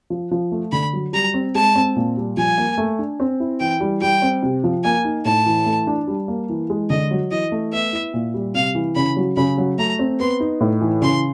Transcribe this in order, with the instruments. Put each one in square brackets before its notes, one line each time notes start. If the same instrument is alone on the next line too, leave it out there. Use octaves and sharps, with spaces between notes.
[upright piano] F3
F3
A3
[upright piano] D3 [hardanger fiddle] B5
[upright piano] F#3
[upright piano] G3 [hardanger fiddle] A#5
[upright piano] C4
[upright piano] G#3 [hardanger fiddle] A5
[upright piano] C4
A#2
G3
[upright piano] F3 [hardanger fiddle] G#5
[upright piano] A#3
A3
D4
C4
E4
[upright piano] E3 [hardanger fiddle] G5
[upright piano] G3
[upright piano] G3 [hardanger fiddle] G5
[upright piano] C4
C3
F3
[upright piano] A#3 [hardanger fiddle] G#5
[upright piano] D#4
[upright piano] A2 [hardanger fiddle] A5
[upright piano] E3
A3
D4
G3
A#3
E3
G#3
[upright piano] D3 [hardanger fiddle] D#5
[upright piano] F#3
[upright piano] E3 [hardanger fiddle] D#5
[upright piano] A3
[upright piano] B3 [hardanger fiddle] E5
[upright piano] E4
A#2
G3
[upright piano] C3 [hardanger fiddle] F5
[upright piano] E3
[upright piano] C#3 [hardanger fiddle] B5
[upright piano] F#3
[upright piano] C#3 [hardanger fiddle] B5
[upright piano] F#3
[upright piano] A3 [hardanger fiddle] A#5
[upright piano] C4
[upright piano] B3 [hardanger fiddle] C6
[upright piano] D#4
A2
E3
[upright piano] C#3 [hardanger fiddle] C6